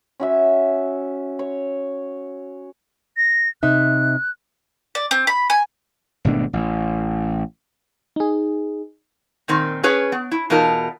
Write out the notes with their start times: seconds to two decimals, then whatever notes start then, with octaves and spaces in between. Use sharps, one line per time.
0.20 C#4 F#4 E5
1.39 C#5
3.17 A#6
3.63 C3 D#4 E5 F#6
4.95 D5
5.11 C4
5.27 B5
5.50 G#5
6.25 G#1 B2 A3 D4
6.53 A1
8.16 D#4 G#4
9.48 A#2 D#3 C4
9.83 C#4 G#4 B4 C#5
10.12 B3
10.31 E4
10.50 E2 B2 D#4 F4 A#4 A5